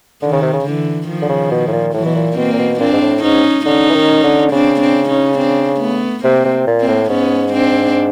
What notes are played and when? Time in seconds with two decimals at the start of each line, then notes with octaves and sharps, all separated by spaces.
0.22 D3 D#3
0.33 C#3
0.42 C3
0.54 C#3
0.65 D3 E3
1.08 D#3 F3
1.22 D3
1.29 C#3
1.51 B2
1.68 A2
1.72 A#2
1.94 A2 E3 F#3
2.06 B2
2.15 A#2
2.37 B2 A#3 C4
2.53 A#2
2.59 B2
2.80 A#2 C4 D4
2.93 G#2
3.02 A2
3.23 G#2 C#4 D#4
3.66 D3 C#4 D#4
3.90 E3
3.95 D#3
4.24 D3
4.52 C#3 C4 D4
4.80 C4 D4
5.09 C#4 D#4
5.38 C4 D4
5.80 A3 B3
6.24 C3 A#3 C4
6.46 C3
6.67 A#2
6.81 A#3 C4
6.88 A2
7.09 G#2 B3 C#4
7.53 C4 D4